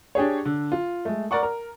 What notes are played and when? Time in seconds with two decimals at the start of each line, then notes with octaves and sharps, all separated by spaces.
0.15 D4 G4 G#4 C#5
0.45 D3
0.72 F4
1.05 G#3 A3
1.31 A#4 D5 F#5 C#6
1.43 A#4